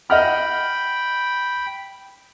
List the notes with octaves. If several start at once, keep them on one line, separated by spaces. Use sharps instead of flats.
D#5 F#5 G5 B5 F6